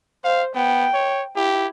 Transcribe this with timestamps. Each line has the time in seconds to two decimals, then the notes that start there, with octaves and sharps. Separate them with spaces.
0.25 C5 F5
0.55 B3 G5
0.94 C#5
1.36 E4 G4